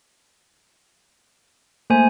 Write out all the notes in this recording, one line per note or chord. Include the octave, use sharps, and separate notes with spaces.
A3 A#3 C5 G#5